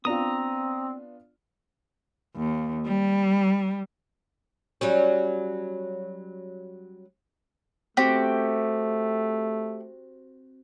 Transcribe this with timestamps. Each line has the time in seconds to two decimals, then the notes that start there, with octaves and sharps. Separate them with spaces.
0.05 B3 C4 D4 F4 A#5 D#6
2.36 D#2
2.86 G3
4.81 F#3 G3 C#4
7.97 A3 C4 F#4 G4